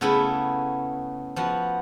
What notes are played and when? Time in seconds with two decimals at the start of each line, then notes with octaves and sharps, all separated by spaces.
0.01 C#3 A3 B3 E4 G5 B5
1.36 F3 B3 F#4